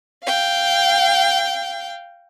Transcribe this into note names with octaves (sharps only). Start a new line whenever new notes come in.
F5 G5